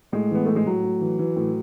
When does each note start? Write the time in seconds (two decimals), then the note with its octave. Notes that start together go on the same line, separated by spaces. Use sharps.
0.12 A2 G#3
0.31 E3 B3
0.45 A2 A3
0.56 G#3
0.66 A2 F#3
0.84 A2
1.01 E3
1.19 E3
1.36 A2